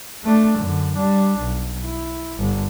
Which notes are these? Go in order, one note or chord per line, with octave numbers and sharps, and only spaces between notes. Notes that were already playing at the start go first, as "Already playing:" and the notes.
A3 D4
F#2 D3
G3 D4
B1
E4
G1 D3